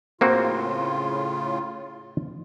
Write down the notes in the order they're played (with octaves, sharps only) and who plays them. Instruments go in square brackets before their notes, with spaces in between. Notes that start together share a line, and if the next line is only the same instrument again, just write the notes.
[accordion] A2 C#3 F4 [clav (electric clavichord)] A#3 C4 F#4